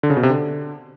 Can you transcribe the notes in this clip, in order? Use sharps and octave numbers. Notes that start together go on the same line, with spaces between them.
D3
C#3
B2
C3
D3